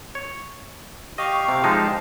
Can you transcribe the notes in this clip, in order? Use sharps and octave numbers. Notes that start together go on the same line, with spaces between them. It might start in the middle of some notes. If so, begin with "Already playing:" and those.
C#5
G4 D#5 F5 C#6
C3
F3 G#3 D#4 A5